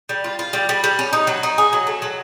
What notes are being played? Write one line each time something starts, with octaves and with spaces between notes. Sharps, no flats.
G3
F4
F4
G3
G3
G3
C#4
D#4
F#3
D#4
G#4
F#3
A3
F#3